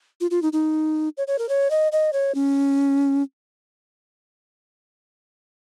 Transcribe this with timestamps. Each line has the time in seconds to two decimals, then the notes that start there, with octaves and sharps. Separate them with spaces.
0.21 F4
0.31 F4
0.42 D#4
0.53 D#4
1.17 C#5
1.27 C#5
1.39 A#4
1.49 C#5
1.70 D#5
1.92 D#5
2.13 C#5
2.35 C#4